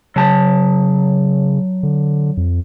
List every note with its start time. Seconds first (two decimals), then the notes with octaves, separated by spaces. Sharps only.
0.16 C#3 F#3 A5
1.83 D3
2.37 F2